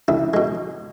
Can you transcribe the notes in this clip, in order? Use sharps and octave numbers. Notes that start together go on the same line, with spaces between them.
C#2 E4
B2 G#3